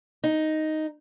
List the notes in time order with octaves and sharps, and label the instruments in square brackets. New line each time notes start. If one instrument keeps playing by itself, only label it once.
[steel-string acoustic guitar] D#4